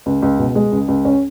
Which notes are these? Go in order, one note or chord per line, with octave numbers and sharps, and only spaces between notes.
C#2
C#2
B2
G#3
C#2
C#2
C#4